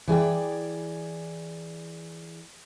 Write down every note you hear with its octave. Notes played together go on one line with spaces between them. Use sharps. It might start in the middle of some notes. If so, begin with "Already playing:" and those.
E3 G#4 D5 G5